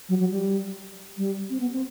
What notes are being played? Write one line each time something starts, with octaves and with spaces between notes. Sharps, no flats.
F#3
F#3
G3
G3
C4
B3
C4